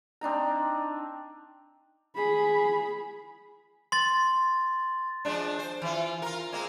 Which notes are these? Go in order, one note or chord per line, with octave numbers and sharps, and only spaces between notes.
C4 D4 D#4 A#5
G#4 B5
C6 A6
F3 G#3 D4
C5
E3 F4
F4 A#4
G#3 A#3 C4